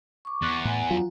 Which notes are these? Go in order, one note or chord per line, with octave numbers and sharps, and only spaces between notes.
C#6 D6
E2 C6 F#6 A6
A2 F#5 G#5 A#5
F#3 D4 F4